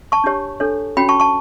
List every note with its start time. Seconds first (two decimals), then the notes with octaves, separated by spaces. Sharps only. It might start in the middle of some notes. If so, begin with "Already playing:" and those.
0.12 A5 C#6
0.24 D4 G4 C#5
0.60 D4 A4 C#5
0.97 C#4 F#4 C#5 G5 B5
1.09 A5 C#6
1.20 A5 C#6